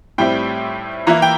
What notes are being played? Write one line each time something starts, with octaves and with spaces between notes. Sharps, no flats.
A2 G3 C4 E4 G5
E3 A#3 E4 A#5
G5